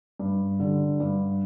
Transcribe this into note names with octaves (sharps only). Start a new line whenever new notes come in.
G2
D3 G3
G2